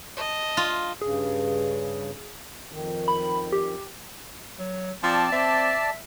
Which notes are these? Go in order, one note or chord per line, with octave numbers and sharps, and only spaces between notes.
D#5 A5
F4
G2 C#3 G#4
F2 D#3
B5
G4
F#3
F3 C4 D5 A5
C4 E5